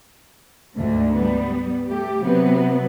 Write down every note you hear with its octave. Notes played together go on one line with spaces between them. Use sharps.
D2 G#2 D3 A3
G3 B3
A3 G4
C3 F#3 B3